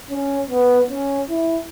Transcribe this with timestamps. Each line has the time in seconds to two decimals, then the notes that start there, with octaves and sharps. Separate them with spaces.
0.10 C#4
0.50 B3
0.90 C#4
1.29 E4